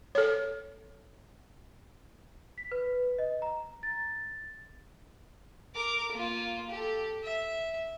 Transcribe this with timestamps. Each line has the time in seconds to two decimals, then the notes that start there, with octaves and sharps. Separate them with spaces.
0.15 A4 C#5
2.58 B6
2.72 B4
3.18 D#5
3.42 A#5
3.83 A6
5.75 A#4 D6
6.12 A#3 F4
6.70 G4 A4
7.24 E5